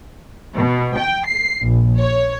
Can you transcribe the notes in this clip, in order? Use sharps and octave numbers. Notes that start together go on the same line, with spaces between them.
B2
G5
C7
A#1
C#5